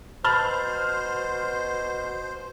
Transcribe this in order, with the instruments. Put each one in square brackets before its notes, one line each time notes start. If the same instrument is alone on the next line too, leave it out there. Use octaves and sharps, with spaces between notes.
[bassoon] B2 [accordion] C5 [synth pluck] A5 B5 [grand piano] F6 A6